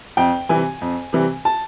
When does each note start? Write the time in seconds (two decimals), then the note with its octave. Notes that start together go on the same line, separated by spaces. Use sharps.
0.17 F2 G5
0.49 C3 E3 G3 G#5
0.81 F2
1.13 C3 E3 G3
1.45 A5